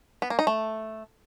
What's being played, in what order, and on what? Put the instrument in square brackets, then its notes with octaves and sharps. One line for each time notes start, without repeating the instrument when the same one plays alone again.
[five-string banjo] B3
A#3
D#4
A3